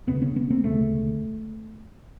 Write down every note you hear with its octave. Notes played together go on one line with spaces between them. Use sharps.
E1 D2 C#3 B3 C#4
B3 C#4
B3 C#4
A#3 C4
E1 D2 C#3 A3 B3